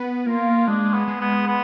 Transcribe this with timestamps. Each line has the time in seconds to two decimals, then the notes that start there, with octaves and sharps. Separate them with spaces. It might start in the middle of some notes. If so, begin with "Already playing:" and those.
Already playing: B3
0.26 A#3 F4
0.67 G#3 D4
0.94 B3
1.08 G#3
1.21 B3
1.47 B3